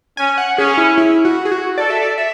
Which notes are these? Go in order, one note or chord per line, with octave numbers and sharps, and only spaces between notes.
C#4 G#5
F#5
C#4 G#4
E4
E4
F#4
G#4
F#4
A4 D5
E5
D5
E5